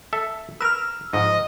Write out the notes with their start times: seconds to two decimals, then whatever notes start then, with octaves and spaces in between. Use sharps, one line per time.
0.13 A4 E5
0.61 A#4 B4 E6 F6
1.13 G#2 F3 D#5